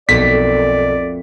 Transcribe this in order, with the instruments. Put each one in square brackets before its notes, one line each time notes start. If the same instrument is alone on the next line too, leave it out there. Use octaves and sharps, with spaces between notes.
[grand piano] B1 [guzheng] F2 A3 A#3 [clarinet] D5 [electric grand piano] B6